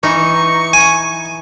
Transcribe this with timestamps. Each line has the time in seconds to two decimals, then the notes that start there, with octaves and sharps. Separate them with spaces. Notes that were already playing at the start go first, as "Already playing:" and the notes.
0.03 E3 D#4 C#6
0.73 G#5